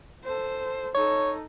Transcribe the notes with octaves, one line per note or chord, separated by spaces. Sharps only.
A4 C5
D#4 A4 C#5